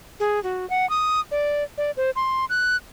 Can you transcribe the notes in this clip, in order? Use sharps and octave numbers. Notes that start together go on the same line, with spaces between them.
G#4
F#4
F#5
D#6
D5
D5
C5
C6
F#6